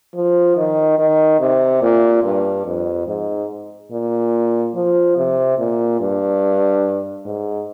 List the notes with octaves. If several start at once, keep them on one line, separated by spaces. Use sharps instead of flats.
F3
D#3
D#3
C3
A#2
G2
F2
G#2
A#2
F3
C3
A#2
G2
G#2